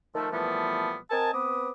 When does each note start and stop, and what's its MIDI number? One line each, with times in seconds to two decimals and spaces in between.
0.14 0.27 51
0.14 0.27 53
0.14 0.27 57
0.31 0.95 46
0.31 0.95 52
0.31 0.95 53
0.31 0.95 55
0.31 0.95 57
0.31 0.95 59
1.11 1.32 60
1.11 1.32 70
1.11 1.32 75
1.11 1.32 80
1.11 1.32 81
1.33 1.69 59
1.33 1.69 60
1.33 1.69 71
1.33 1.69 86
1.33 1.69 87